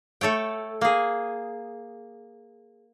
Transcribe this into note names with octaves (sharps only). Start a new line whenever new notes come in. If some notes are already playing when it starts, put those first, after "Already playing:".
A3 A4 C#5 G5
A#3 G#4